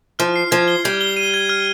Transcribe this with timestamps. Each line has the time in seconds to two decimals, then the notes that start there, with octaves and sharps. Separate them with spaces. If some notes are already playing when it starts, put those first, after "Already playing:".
0.19 F3 F6
0.36 C7
0.51 F3 G#6
0.68 G7
0.84 G3 G#6
1.01 G7
1.17 D#7
1.34 G#6
1.49 F6